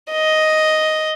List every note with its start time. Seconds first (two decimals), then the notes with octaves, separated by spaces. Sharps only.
0.12 D#5